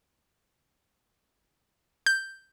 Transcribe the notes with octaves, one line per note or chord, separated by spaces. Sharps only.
G6